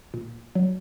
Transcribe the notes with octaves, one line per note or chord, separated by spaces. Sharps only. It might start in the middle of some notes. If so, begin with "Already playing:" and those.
A#2
F#3